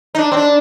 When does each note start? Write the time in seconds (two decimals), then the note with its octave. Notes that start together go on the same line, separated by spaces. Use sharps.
0.15 D#4
0.18 D4
0.32 C4
0.37 D4